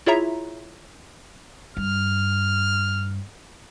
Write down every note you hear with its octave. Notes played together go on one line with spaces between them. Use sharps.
E4 F4 G#4 C#5 E5 A#5
G2 F6